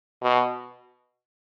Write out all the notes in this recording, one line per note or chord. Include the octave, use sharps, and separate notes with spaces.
B2